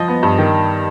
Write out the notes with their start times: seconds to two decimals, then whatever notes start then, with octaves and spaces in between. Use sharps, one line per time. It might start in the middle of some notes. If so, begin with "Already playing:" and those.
Already playing: F3 D#5
0.08 B3
0.23 G2
0.38 D#3